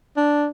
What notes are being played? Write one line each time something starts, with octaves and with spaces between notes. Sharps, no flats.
D4